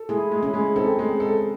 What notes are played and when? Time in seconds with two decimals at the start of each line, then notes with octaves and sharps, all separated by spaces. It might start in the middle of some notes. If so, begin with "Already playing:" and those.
Already playing: A4
0.09 G#3 E4 G#4
0.31 G#3
0.43 C#4 E4
0.54 G#3
0.76 C4 D#4 A4
0.99 G#3
1.20 A4